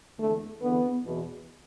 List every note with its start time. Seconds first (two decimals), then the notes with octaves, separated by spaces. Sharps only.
0.19 E2 D3 A3
0.62 E2 D3 B3
1.05 E2 B2